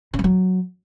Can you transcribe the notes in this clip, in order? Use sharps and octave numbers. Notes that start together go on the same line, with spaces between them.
C#3
G3
F#3